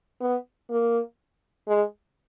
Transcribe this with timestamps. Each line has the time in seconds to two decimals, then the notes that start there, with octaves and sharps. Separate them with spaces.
0.21 B3
0.70 A#3
1.68 G#3